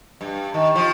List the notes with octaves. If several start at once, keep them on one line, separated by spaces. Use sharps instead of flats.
G2
D#3
F3